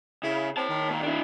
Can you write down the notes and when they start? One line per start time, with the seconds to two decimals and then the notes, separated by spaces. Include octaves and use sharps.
0.23 C#3 E4
0.57 C4 C#5 A5
0.69 D#3
0.90 A#2
1.03 D4 E4